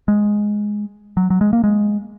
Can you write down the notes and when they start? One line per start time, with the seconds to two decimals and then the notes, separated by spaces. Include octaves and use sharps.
0.08 G#3
1.17 F#3
1.30 F#3
1.41 G#3
1.53 A#3
1.64 G#3